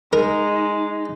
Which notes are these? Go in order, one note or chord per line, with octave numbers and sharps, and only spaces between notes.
G#3 D#4 A#4